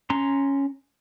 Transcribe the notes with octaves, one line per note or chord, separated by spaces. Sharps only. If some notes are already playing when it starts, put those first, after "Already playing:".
C#4 A#5 C6